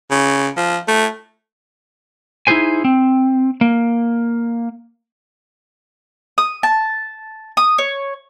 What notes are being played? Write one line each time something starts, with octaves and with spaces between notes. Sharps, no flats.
C#3
F3
A3
D#4 E4 F#4 G#4 C5 G#5
C4
A#3
D#6
A5
D#6
C#5